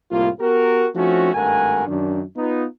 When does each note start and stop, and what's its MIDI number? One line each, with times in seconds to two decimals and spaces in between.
0.11 0.29 36
0.11 0.29 45
0.11 0.29 58
0.11 0.29 65
0.40 0.87 59
0.40 0.87 66
0.40 0.87 67
0.40 0.87 70
0.95 1.33 53
0.95 1.33 57
0.95 1.33 60
0.95 1.33 61
0.95 1.33 63
0.95 1.33 66
1.33 1.85 32
1.33 1.85 43
1.33 1.85 57
1.33 1.85 70
1.33 1.85 78
1.33 1.85 80
1.87 2.21 42
1.87 2.21 51
1.87 2.21 62
2.37 2.64 59
2.37 2.64 63
2.37 2.64 65